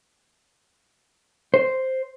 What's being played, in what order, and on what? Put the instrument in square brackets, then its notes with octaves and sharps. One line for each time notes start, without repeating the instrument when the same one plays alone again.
[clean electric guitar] C5